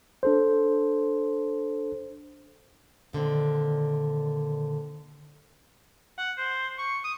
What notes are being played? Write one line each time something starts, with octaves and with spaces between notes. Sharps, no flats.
D4 A4 C5
A#2 D3 D#3 C4
F#5
C5
C#6
D#6